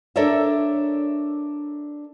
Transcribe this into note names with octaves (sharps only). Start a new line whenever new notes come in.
D4 A4 A#4 C#5 D5 E5